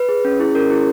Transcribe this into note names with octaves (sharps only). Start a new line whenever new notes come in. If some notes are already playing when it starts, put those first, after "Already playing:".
Already playing: B4
G#4
C#4
E4 G#4
C#4 A#4
E4 G#4